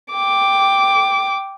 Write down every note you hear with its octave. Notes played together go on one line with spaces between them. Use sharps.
G5 D6